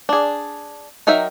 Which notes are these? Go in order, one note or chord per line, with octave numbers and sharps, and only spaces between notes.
D4 G#4
F#3 D#4 A#4 E5 G5